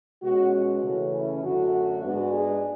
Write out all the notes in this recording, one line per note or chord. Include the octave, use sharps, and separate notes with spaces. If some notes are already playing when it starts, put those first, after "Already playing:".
B2 G#3 C#4 F#4
F#4
C#3 E3 A3 C#4
E4
F#2 D3 A3 F#4
G#2 G#3 B3 D4 F#4
G#4